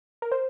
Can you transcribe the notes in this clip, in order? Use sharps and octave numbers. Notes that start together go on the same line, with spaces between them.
A#4
C5